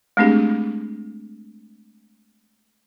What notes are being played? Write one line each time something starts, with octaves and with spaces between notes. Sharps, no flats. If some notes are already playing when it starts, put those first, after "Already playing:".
G#3 A3 C4 D4 G4 G#4